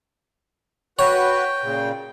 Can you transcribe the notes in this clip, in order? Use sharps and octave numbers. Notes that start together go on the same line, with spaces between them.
F#4 B4 C#5 G5
A#2 C#3